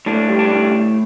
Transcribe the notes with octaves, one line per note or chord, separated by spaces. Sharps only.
A2 D4
G3
D4
A2